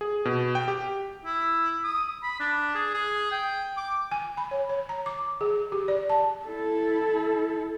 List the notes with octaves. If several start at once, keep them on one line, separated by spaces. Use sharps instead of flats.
G#4
B2
G5
G4
E4
D#6
B5
D4
G#4
G#4
G5
D6
G#5
B5
C#5
C#5
A#5
D6
G#4
G4
D5
A5
E4 A4